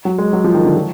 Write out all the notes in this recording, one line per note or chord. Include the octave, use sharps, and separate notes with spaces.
F#3
G#3
F#3
F3
D#3
D3
F3